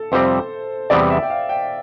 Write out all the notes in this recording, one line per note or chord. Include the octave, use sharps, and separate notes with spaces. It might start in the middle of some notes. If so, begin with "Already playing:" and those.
Already playing: A4
F2 C3 G3 C4 C5
E2 C3 E3 G3 B3 D5
E5
G5
F5
G5